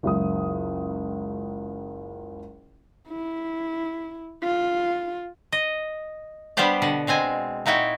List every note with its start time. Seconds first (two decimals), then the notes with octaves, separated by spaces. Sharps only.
0.03 F#1 C#2 D#6
3.08 E4
4.43 F4
5.52 D#5
6.57 G3 B3 D4 G4 C5 D5
6.82 B2 D3 F#5
7.07 B2 G#3 C4 G#5
7.66 A#2 D#4 E4 F#4 G5